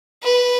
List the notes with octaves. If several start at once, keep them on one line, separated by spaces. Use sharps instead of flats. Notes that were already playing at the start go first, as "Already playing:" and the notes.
B4